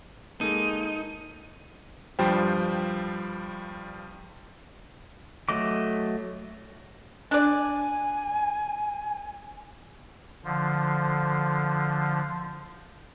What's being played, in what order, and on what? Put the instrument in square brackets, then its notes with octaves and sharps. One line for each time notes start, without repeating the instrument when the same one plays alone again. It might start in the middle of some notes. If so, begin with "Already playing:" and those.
[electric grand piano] G#3 A#3 A4 [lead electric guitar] D#4
[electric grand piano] G2 F3 G3 C5 G5
[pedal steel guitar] F#3 A3 D#5 D6
[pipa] D4 D5 [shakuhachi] G#5
[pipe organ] D3 F3